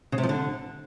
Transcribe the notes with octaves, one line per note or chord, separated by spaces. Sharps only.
C#3
C3
F3
D3